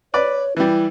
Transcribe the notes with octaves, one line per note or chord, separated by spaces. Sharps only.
B4 C#5 D5
E3 G3 E4